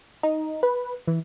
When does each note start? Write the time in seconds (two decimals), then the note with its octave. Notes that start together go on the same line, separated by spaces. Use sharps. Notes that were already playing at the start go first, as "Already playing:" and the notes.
0.23 D#4
0.63 B4
1.07 E3